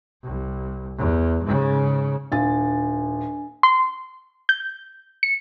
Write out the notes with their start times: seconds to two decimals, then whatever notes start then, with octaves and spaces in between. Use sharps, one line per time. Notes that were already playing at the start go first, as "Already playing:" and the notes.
0.23 C2
0.98 E2
1.44 G#2 C#3
2.32 D#1 D4 G#5 A6
3.63 C6
4.49 G6
5.23 C#7